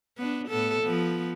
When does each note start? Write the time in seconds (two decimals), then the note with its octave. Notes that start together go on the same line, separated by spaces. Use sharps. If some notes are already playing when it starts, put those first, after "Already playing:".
0.18 B3 D4
0.48 A2 B3 A4
0.82 F3 B3